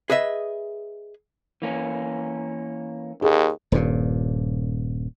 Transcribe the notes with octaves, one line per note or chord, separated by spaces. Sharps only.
G#4 B4 D#5 E5
E3 A#3 C#4
D#2 G#4
D#1 G2 A#2